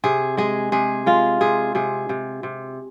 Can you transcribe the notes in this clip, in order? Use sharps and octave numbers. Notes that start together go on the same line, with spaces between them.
C3 G#4
G#3 G#4
C3 G#4
G#3 F4
C3 G#4
C3 G#4
C3
C3